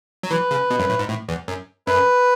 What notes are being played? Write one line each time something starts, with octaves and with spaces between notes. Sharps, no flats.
F#3
E3 B4
C#3
B2
F#2
A2
G#2
A2
E2
F#2
F#2 B4